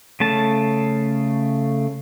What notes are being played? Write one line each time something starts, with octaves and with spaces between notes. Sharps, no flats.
C#3 A3 A5